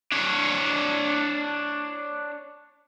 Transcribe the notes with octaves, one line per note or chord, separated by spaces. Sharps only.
D4 C#5